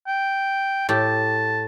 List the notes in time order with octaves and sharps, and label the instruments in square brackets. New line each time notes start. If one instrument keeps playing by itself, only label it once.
[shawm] G5
[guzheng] A2 G4 [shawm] A5